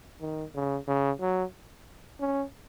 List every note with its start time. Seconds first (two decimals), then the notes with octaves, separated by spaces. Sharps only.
0.21 D#3
0.55 C#3
0.88 C#3
1.21 F#3
2.21 C#4